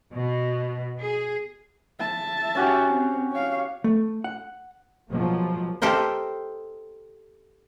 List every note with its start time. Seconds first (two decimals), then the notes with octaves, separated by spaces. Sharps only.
0.12 B2
1.00 G#4
2.00 E5 A5
2.55 C#4 F#4 G4
2.88 C4
3.32 C#5 F5
3.84 A3
4.24 F#5
5.11 B2 F3 F#3 G#3 A#3
5.82 G4 A4 A#4 C5 D#5